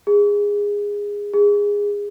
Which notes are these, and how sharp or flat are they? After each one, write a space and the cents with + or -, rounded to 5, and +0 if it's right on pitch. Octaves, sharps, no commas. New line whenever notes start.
G#4 -20
G#4 -20